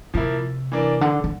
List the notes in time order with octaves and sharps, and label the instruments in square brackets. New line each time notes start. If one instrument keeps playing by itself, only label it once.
[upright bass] C3 [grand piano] F3 A#3 E4
[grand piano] E3 A#3 D4
[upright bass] D3
D3